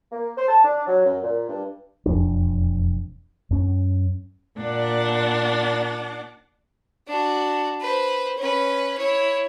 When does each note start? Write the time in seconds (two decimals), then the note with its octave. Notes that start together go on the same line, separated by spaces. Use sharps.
0.12 A#3
0.36 C5
0.48 A5
0.63 D4
0.86 F#3
1.05 F#2
1.22 A#2
1.48 G2
2.06 E1 F2 D4
3.51 F#2 C#4
4.60 A#2 D4 F#5 D6
7.08 D4 F#4
7.81 B4 C5
8.38 C#4 B4
8.97 E4 C#5